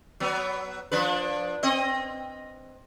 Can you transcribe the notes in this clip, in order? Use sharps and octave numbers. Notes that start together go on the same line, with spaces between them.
F#3 B3
F3 D4 B4
C4 D#5